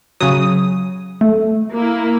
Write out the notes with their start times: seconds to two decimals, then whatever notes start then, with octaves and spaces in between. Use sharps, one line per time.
0.21 C#3 F#3 D#6
1.21 A3
1.72 A#3 E4